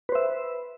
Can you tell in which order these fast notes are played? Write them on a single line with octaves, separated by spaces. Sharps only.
B4 C5 E5